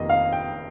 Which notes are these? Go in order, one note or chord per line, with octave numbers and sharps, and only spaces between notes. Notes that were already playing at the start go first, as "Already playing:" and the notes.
Already playing: F1 F2 C3 D#3 A#3 D#5
F5
G5